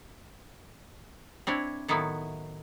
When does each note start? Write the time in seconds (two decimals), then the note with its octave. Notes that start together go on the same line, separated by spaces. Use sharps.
1.47 C4 D4 E4 C#5
1.88 A2 D#3 F#3 B3 E4